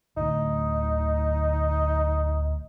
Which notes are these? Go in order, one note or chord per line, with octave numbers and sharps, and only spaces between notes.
D1 D2 D#4